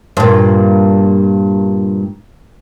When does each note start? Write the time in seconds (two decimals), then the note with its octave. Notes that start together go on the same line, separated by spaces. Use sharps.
0.17 G2 A#2